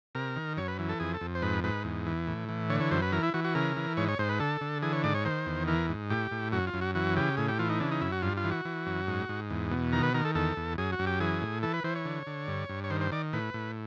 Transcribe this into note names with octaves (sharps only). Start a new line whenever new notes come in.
C3 A#4
D#3
F#2 C#5
B4
E3
A4
F2 G#4
A4
F2
C5
G#2 B4
G#2 B4
E2
E3
A2
E3
D3 C#5
C#5
F#2 C5
B4
E3 A#4
E4
E3 F#4
F#4
C#3 A#4
E3
G#2 C#5
C#5
G#2 C5
B4
D3 A4
D3
E3 G#4
C#5
G#2 D5
C#5
D#3 C5
E2
E3 A#4
G#2
A2 G4
A2
F#2 F#4
F4
F#2
F#4
E3 F#4
C#3 G4
A2 G#4
G4
E3 F4
D#4
C#3 D4
D#4
F#2 E4
F#4
G2 F4
F4
E3
F#4
E3
F#2
G#2
G#2
E2
B2
D#3 A#4
B4
D#3 A#4
A4
E2 A4
E2
F#2 G#4
F#4
F#2
G4
E3 G#4
A2
E3 A4
B4
E3 C5
C#5
D3
D3
G2
G2
C#5
D#3 C5
C5
D#3 D5
A2 B4
A2